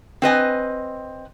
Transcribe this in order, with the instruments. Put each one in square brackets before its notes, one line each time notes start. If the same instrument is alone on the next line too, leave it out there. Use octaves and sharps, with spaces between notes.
[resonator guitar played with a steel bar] C4 B4 D#5 G#5